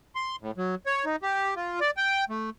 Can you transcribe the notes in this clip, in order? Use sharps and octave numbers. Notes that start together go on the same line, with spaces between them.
C6
A2
F#3
C#5
D#4
G4
F4
D5
G5
A3